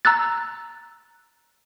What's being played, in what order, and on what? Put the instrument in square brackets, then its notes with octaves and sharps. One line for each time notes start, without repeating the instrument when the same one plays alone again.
[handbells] A#5 E6 F#6 A6